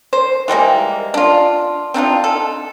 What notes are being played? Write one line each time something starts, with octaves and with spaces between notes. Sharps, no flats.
C5
E3 G3 G#3 A#3
D4 F4
C4 D4 D#4 F4
A4